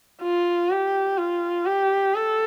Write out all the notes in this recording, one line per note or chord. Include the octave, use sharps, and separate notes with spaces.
F4
G4
F4
G4
A4